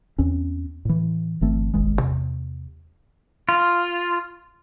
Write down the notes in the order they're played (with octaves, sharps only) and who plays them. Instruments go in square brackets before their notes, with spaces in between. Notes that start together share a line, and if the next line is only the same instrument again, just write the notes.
[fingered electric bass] E2 C4 C#4
A2 E3
G1 E3 A3 C4
D#1 G#1 D#2 G#3
E2 C3
[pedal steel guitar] F4